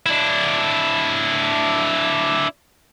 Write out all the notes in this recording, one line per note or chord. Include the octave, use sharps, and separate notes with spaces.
D4 E4